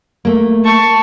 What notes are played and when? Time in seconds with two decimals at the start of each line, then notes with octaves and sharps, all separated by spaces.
0.25 A3 A#3
0.64 A5 C#6